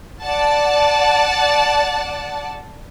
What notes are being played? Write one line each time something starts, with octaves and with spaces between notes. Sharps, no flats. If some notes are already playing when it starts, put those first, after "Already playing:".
D5 F#5 A5